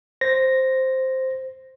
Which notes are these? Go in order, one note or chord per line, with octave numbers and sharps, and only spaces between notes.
C5 A#6